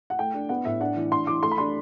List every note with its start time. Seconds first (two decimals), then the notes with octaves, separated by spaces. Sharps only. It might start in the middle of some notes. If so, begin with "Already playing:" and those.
0.10 F#5
0.18 A3 G5
0.34 D4
0.49 B3 F#5
0.65 A2 E5
0.81 D4 F#5
0.96 E3
1.12 D4 C6
1.27 E3 D6
1.43 A3 C6
1.51 B5
1.58 D4 C6